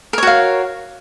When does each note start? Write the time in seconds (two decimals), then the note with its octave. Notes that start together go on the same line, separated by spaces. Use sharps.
0.13 A#4
0.18 C#5
0.23 F#4
0.27 F5